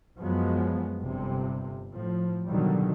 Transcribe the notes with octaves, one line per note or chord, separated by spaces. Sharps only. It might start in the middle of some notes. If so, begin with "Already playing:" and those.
F#2 F3 F#3 G#3 B3
G1 G2 C3
A2 F3
B2 D3 D#3 F#3 G3